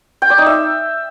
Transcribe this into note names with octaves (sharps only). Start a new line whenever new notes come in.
G5
D5
D#4
E5